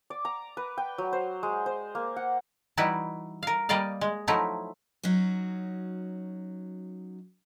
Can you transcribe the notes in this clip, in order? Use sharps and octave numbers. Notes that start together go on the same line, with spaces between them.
D5
A#5
B4
G5
F#3
C5
G#3
C5
A#3
F#5
E3 G3 D#4 E4 F#4 B4
A#4 F5
G3 A#3 D5 D#5 F5
G#3
F3 F#3 A3 D#4 E4
F#3 C#4 D#4 F#4